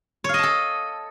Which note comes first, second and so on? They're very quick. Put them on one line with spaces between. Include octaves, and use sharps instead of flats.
C#5 F5 D#5 A5 A4